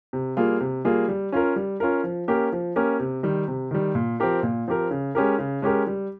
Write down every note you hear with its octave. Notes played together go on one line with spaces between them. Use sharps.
C3
G3 A#3 F4 G#4
C3
G3 A#3 F4 G#4
G3
C#4 F4 A#4
G3
C#4 F4 A#4
F3
A#3 C#4 G4 A#4
F3
A#3 C#4 G4 A#4
C3
D#3 G3
C3
D#3 G3
A#2
F3 C4 G4 A#4
A#2
F3 C4 G4 A#4
C#3
G#3 C#4 G4 A#4
C#3
G#3 C#4 G4 A#4
G3